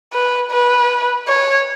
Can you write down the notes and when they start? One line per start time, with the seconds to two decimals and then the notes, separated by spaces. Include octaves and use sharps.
0.13 B4
0.51 B4
1.28 C#5